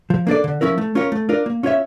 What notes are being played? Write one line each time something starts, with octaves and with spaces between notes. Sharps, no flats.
F3
A#3 D4 A4 D5
D3
F3 C#4 E4 A#4
A3
C#4 F4 A#4 C#5
A3
D4 F4 A#4 D5
A#3
C#4 F4 C#5 E5